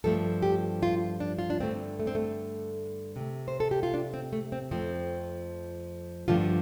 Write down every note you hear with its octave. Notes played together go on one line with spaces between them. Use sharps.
G2 F3 A3 A4
G4
F4
D4
F4
D4
G2 D3 A3 C4
A3
C4
A3
C3 A3
C5
A4
G4
F4
D4
C4
A3
C4
F2 F3 A3 C4
G2 D3 F3 A3 F4